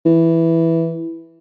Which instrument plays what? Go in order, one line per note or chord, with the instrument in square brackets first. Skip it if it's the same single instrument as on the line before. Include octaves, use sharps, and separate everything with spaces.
[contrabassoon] E3